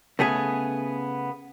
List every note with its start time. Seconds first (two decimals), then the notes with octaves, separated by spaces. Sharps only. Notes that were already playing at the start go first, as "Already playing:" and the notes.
0.19 C#3 A3 B3 G#4